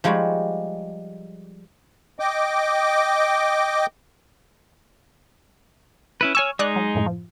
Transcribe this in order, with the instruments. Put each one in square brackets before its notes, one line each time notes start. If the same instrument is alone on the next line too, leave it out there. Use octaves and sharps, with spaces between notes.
[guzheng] F3 G3 G#3 D#4 F#4
[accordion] D#5 G5 D6
[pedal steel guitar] C#4 E4 B4
[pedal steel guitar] C#5 G#5 E6 [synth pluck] C#6 F6
[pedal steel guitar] G#3 D#4 [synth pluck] D5 D#6 F#6
[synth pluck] F#3
F#2 A2
F3